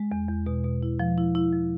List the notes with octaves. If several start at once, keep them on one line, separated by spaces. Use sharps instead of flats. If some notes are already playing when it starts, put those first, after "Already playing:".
Already playing: G#3
E2
E2
B2
B2
E4
F3
E4
E4
F3